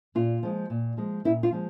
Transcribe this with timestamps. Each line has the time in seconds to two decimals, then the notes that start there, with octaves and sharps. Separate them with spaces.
0.15 A#2 F4
0.43 F3 G#3
0.70 A#2
0.97 F3 G#3
1.25 A#2 E4
1.43 F4
1.52 F3 G#3